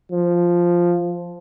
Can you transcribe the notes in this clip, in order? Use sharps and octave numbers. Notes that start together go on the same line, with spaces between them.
F3